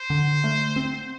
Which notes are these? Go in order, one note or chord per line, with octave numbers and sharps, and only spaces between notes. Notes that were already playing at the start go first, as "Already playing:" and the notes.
Already playing: C5
D3
A3
C4